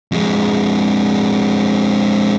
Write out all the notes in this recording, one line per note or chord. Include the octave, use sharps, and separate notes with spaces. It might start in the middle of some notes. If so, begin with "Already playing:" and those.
F2 G#3